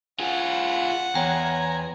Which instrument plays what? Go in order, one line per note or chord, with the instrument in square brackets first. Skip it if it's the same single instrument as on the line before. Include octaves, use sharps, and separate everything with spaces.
[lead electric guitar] F4 G#4 [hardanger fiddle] F#5
[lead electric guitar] E2 [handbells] C#5 G5 [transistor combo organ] G#5 A#5